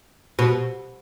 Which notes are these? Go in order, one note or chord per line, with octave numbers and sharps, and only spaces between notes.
B2